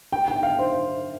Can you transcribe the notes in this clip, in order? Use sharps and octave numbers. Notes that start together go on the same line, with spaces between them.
G5
G5
F5
C5